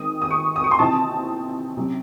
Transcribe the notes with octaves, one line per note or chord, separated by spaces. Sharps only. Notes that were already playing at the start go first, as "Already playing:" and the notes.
Already playing: D#3 G#3 C4 D#6
D#6
C#6
D#6
C#6
C6
C3 E3 C4 D#4 A5
C3 F#3 C#4